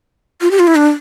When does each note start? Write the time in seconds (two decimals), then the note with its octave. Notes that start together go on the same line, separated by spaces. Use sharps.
0.41 F4
0.51 G4
0.59 F4
0.67 E4
0.76 D4